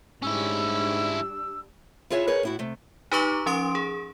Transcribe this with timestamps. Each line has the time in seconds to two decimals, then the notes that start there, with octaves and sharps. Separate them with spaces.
0.23 G#2 G3 C#4 D4 E4 E6
2.10 E4 F4 G#4 C#5 E5
2.27 G#4 A#4 B4 C#5
2.43 A2 E4 F#4
2.59 C3 A3
3.12 D#4 G4 B4 A#5 C#6 D6
3.46 F3 C#4 C6 D#6 D7
3.75 G#4